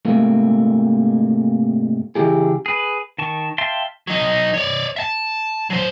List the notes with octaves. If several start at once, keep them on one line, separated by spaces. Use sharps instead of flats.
G#2 C3 A3 A#3
C#3 E3 G4 G#4
G#4 B4
D#3 A5 C#6
E5 F5 G5 A5 C6
F#3 D#4
C#5 D5
E5 A5
F#3 C5